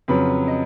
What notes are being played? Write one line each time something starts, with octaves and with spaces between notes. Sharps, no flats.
F2 C#3 F#3 B4
D#5